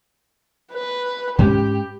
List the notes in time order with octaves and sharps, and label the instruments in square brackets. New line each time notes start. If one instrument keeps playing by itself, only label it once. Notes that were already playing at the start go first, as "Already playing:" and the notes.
[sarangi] B4
[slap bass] G#2 G#3 C#4 [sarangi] G4